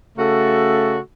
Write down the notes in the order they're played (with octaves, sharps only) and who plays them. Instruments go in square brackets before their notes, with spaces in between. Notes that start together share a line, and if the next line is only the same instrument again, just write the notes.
[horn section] C#3 A3 F#4 A4